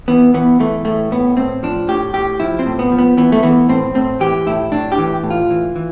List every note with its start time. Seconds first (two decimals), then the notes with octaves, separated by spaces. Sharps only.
0.08 E3 B3
0.34 E3 B3
0.59 E3 A3
0.85 A2 A3
1.11 A2 B3
1.37 A2 C4
1.63 F3 D4
1.88 A2 G4
2.14 A2 G4
2.40 F3 E4
2.59 C4
2.66 A2
2.79 B3
2.92 F3
2.99 B3
3.17 E3 B3
3.32 A3
3.43 E3 B3
3.69 A2 C4
3.95 A2 C4
4.20 E3 G4
4.47 A2 E4
4.72 A2 D4
4.92 G4
4.98 E3
5.23 A2
5.31 F4
5.50 E3
5.76 E3